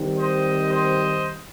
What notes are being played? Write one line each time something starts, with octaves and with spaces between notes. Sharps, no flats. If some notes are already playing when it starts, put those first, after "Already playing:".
Already playing: D#3 G3 C4
C5 D#5
C5 D#5